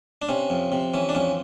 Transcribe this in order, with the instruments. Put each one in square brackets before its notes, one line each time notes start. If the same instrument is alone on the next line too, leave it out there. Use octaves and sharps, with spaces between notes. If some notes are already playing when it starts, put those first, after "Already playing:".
[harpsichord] D4
C3 C#4
F2
C3
E3 C#4
D4
F2 C#4